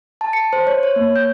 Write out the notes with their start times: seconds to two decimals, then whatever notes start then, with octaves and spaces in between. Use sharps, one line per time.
0.21 A5
0.33 C#7
0.53 C5
0.67 C#5
0.83 C#5
0.96 A#3
1.16 G6